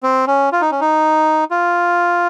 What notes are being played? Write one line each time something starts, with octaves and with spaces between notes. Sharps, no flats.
C4
C#4
F4
D#4
C#4
D#4
F4